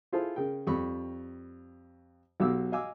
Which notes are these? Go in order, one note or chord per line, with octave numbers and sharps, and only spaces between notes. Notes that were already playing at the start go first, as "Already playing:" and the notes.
E4 F4 G#4 A4 C5
C#3 A#4 G5
F2 G3 B5 C#6
B1 B2 G4 F5 D6 E6
D#5 F5 G#5 D6 E6